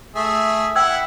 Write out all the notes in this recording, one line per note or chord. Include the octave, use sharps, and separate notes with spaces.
A3 G#4 E5
E4 F#5 G5 E6 G#6